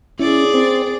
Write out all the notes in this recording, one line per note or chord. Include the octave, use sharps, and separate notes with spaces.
C#4 E4 G#4 D5
C4 C5